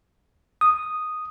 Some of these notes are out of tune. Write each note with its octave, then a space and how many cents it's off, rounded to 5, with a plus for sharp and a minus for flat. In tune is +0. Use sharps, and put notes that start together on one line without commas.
D#6 -5